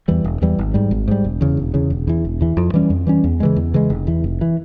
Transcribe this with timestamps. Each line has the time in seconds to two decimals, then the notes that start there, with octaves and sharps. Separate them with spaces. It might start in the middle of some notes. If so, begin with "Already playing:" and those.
0.08 E2 E3 G3
0.24 E1
0.42 E2 E3 G3
0.59 G#1
0.74 G#2 G3
0.91 G#1
1.08 G#2 G3
1.24 E1
1.41 E2 C#3
1.57 E1
1.74 E2 C#3
1.90 E1
2.07 E2 E3
2.25 E1
2.41 E2 E3
2.57 F2
2.74 E3 G3 C#4
2.90 F2
3.07 E3 G3 C#4
3.24 E2
3.40 C#3 E3 G#3
3.56 E2
3.74 C#3 E3 G#3
3.90 F1
4.07 E2 E3
4.24 F1
4.41 E3